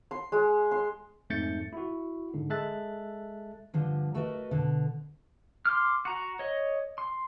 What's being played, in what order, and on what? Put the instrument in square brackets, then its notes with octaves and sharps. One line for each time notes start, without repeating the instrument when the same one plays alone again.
[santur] C6
G#3
C6
[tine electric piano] F2 G#2 A3 G6 A6 C#7
E4 F#4
G#2 D3
G#3 A4 E5 A5 F#6 A6
[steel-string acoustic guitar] G2 D3 F3
A3 F#4 A#4 B4 D#5
B2 D3
[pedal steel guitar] C6 D6 F6
F#4 A#5
C#5 D#5
C6